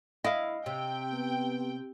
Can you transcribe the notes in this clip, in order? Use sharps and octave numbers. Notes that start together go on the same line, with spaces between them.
E4 D#5 F5
C3 G5
B3